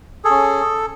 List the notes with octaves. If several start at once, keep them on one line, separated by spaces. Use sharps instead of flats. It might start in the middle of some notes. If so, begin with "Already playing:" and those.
G#4 A4
C#4